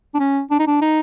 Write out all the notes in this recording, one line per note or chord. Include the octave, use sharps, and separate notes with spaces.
D4
C#4
D4
D#4
D4
D#4